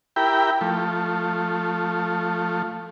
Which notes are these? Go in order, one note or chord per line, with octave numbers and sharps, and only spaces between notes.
E4 G4 A#4 G5 B5
F3 A3